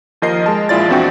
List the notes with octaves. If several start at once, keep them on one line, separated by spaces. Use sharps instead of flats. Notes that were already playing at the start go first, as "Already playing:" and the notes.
D#2 F3 A#4 D#5 C7
G#3 A5
A#1 G#3 E4 F4 D5 A6
A#1 E2 C4 D4 F#4 G5